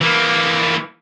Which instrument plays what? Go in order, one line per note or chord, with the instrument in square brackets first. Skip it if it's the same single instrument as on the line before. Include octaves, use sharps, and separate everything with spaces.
[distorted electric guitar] E3 A#3